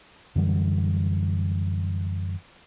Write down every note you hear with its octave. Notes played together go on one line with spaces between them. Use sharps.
F#2 D3 E3 G3